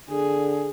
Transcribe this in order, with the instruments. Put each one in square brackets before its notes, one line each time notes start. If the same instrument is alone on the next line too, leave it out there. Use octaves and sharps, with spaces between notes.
[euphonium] D3 [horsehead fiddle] G#4